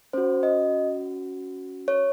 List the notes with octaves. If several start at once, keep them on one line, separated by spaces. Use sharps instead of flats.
C#4 F#4 C5
D#5
C#5